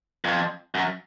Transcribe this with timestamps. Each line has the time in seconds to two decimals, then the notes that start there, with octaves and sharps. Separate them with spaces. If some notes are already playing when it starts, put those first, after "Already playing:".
0.25 F2
0.75 F#2